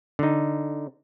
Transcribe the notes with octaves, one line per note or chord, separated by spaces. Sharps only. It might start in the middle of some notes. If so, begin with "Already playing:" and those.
D3 D#4